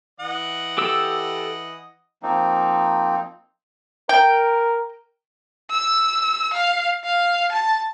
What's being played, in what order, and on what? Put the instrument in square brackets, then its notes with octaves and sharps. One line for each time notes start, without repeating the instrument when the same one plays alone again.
[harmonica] E3 D#5 F#5
[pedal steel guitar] G4 A4 E6
[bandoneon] F3 A#3 C4 D#4
[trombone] A#4 [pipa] G5
[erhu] E6
F5
F5
A5